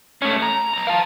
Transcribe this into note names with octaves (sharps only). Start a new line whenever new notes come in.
A3 C#4
A#5
B1 A#5
F5 A5